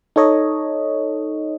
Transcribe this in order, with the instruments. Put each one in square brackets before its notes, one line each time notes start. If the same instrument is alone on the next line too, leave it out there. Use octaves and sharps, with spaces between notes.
[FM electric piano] D#4 A4 C#5 D#5